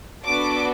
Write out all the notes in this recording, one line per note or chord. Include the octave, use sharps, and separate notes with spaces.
B3 D4 F#4 A4 D6